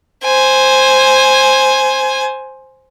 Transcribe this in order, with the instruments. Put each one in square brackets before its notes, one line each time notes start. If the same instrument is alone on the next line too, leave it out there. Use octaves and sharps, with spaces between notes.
[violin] C5 G#5